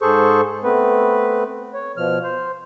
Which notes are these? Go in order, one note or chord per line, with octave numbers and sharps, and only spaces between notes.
G#2 G#4 A4 C5 C#6
A3 B3 C4 B4
C#5
B2 F3 F6
C5